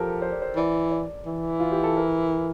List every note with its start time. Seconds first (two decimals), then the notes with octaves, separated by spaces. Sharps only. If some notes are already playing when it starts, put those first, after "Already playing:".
Already playing: F3 G4 A4 A#4
0.22 C5
0.32 D5
0.42 C5
0.56 E3 D5
0.91 D5
1.26 E3
1.60 F4
1.72 G4
1.84 A4
1.97 A#4